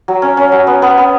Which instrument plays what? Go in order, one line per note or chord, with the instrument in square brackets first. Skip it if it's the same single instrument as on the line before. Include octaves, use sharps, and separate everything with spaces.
[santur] F#3
C#4
C#4
F#3
B3
B3
B3